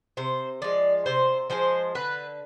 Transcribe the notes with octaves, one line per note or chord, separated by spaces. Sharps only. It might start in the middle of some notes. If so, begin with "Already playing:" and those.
C3 C5
F3 G#3 D5
C3 C5
F3 G#3 C5
D3 B4